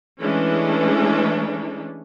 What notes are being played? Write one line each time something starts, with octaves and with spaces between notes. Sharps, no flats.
E3 G#3 A3 C#4 D4